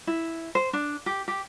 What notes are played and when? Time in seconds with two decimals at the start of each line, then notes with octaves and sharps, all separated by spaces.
0.07 E4
0.55 C5
0.73 D4
1.06 G4
1.28 G4